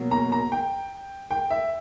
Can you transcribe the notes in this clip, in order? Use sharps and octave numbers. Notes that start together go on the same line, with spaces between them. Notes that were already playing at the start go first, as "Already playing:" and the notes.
Already playing: B2 F#3 A#3
A#5
A#5
G5
G5
E5